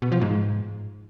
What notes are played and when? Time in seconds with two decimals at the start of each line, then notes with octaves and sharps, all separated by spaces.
0.02 B2
0.12 F3
0.21 G#2